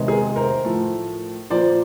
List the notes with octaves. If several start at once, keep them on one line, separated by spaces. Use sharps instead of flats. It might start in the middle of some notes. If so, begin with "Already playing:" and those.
Already playing: C3 D#3 G#3 B3
G#4 A#4
A#4 C5
A2 F3 A3
A#2 F3 A#3 C5 D5